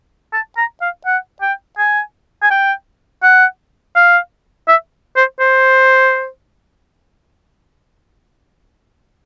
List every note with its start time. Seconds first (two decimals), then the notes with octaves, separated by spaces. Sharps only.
0.33 A5
0.57 A#5
0.82 F5
1.06 F#5
1.42 G5
1.78 G#5
2.43 G#5
2.51 G5
3.23 F#5
3.96 F5
4.68 E5
5.16 C5
5.40 C5